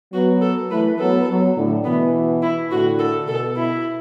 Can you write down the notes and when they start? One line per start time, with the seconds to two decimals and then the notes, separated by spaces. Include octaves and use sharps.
0.13 F#3 B3 F#4
0.42 A4
0.70 E3 A3 B4
0.99 F#3 B3 A4
1.28 F#3 B3
1.56 A2 D3
1.84 B2 E3 B3
2.43 E4
2.71 A2 D3 F#4
2.99 A4
3.28 B2 A4
3.56 E4